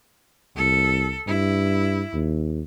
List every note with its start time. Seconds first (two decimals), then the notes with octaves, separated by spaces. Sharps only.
0.56 C2 A4
1.27 G2 E4
2.13 D#2